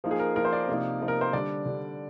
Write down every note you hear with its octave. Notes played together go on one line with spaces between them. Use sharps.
F3 A#3 D#4
G#4
A#4
F3 A#3 D#4 A#4
C5
D5
C3 F3 A#3 D#4
C3 F3 A#3 D#4
A#4
C5
D3 G3 D4 D5
D3 G3 D4